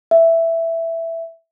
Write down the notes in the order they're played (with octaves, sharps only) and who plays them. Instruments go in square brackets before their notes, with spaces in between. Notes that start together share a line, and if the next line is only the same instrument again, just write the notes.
[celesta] E5